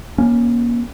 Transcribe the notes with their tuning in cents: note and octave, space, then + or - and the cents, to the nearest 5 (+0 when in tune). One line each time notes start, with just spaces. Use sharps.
A#3 +35 C#4 +0